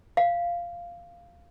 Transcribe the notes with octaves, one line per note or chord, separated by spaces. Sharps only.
F5